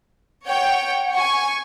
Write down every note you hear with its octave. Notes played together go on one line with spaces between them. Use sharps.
C#5 F#5 G5
G#5 C#6